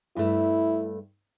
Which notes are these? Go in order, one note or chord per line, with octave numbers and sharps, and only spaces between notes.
G2 A3 E4